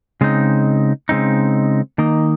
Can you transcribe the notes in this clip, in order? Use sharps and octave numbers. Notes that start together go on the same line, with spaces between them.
C#3 G#3 C4 D#4
C#3 G#3 C4 D#4
D#3 A#3 D#4